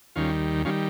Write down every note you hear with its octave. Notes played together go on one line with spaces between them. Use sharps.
D#2 D#3 G3 C#4 F4
D#3 G3 C#4 F4